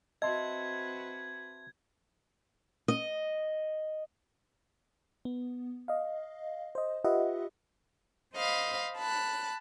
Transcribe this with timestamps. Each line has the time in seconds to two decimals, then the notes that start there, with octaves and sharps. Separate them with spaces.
0.22 C4 F#4 B4 D#5 E5 A5 C6 G#6
2.88 D#5
5.25 B3
5.88 D#5 F5
6.75 C5 D#5
7.05 F4 G4 B4 D#5 E5 F#5
8.34 C5 D#5 F5 B5
8.96 A5 B5 F#6